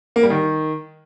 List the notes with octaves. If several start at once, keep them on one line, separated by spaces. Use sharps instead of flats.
A#3
G3
D#3